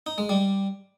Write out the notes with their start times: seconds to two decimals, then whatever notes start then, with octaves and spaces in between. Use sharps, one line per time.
0.06 D#4
0.18 G#3
0.29 G3